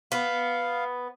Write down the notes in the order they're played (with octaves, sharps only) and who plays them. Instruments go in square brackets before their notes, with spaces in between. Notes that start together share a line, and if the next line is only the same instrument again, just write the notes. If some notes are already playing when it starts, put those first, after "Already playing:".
[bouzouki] B3 [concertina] F5